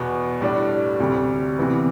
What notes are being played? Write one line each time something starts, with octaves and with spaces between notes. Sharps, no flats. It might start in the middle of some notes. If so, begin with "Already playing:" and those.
Already playing: E2 B2 B3
A2 G3 D4
D2 C3 G3
C3 E3 B3 E4